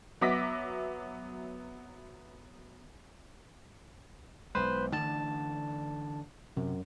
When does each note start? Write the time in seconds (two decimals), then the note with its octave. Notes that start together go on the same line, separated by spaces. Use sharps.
0.21 F#3 B3 E5 D6 A#6 B6
4.55 B1 G#3 B4 C5
4.93 D3 E3 A3 A5
6.57 F#2 C3